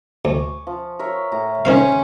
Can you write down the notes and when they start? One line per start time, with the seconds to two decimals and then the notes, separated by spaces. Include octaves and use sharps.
0.25 D2 G#5 C#6 D6
0.67 F3
0.99 A#4 C#5 E5
1.32 A2 A#5
1.65 D#3 C4 C#4 C5 F5 G5